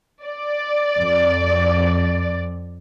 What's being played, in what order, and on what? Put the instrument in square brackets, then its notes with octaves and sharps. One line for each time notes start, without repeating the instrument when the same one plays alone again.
[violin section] D5
[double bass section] F2